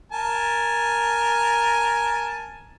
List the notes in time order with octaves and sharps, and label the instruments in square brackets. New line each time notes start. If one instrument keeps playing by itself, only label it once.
[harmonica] A#4 G#5 A5